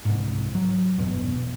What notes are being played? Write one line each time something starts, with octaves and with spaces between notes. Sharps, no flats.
C2 G#2
F#3
G1 E2 B2